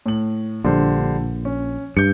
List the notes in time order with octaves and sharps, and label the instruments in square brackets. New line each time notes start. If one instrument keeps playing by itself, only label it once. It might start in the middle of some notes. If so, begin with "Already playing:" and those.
[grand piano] A2 F#7
[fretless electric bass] A#1 [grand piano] D3 G3 C5
[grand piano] C#4
[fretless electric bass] G2 [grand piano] G6 C#7